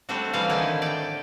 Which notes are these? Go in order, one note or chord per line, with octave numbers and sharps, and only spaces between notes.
G3 A3 C4 D4 F#4
E3 G3 F4 F#4 F5 A#5
D3 D#3 D#4 E4 G#5
D5 G5